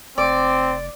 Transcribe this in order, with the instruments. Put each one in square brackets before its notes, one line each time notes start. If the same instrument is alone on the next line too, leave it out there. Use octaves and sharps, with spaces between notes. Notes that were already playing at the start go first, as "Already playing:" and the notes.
[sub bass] F1 [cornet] C4 [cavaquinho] D5